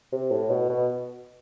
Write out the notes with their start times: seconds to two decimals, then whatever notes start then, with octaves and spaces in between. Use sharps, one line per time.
0.12 C3
0.31 A2
0.50 B2
0.69 B2